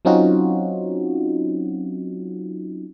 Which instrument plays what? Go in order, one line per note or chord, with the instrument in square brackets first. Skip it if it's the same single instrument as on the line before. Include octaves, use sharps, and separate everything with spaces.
[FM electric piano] F#3 C4 C#4 D#4 F4 F#4